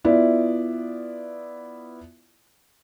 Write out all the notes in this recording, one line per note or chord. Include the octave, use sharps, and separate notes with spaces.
B3 E4 F4 D5 E5